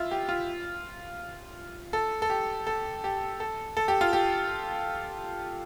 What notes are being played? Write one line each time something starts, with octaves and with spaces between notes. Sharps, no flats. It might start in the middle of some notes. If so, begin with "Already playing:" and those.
Already playing: E4 F4
G4
F4
A4
A4
G4
A4
G4
A4
A4
G4
F4
G4